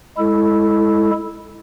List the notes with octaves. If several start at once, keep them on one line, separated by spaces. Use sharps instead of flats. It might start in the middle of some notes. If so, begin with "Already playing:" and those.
G#3 E4 A4